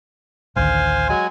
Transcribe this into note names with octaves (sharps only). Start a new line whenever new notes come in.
A1 D2 D#3 C5 F5 G#5
F#3 G#3 G#5